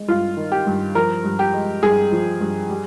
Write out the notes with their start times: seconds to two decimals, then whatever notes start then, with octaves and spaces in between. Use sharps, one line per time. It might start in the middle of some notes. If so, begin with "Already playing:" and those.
Already playing: G#3
0.08 G2 F4
0.37 D#3
0.52 G4
0.67 G2
0.95 F3 A#4
1.24 G2
1.39 G4
1.54 G#3
1.83 G2 G#4
2.12 F3
2.41 G2
2.70 G3